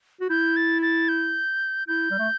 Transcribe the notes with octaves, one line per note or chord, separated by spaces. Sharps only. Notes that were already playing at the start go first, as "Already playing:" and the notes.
F#4
E4 G6
A6
A6
G6
E4 G6
G3
A3